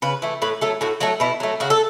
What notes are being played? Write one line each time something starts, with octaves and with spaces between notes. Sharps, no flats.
C#3 B4
E3 A3
A2 B4
F#3 A3 A4
A2 F#4
F#3 A3 F#4
B2 E4
F#3 A3
C#3 F#4
A4